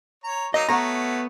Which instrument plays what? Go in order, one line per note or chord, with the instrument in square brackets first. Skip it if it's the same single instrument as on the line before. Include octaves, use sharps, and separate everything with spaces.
[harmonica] C#5 A#5
[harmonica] F#3 A#3 D#4 [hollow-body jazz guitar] D#5
[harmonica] A3 F#4 C#5 [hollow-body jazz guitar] B3 A#5